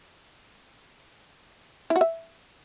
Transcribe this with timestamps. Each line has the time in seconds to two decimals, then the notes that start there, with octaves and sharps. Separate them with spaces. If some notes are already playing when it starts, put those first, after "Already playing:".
1.90 E4
1.96 F#4
2.01 E5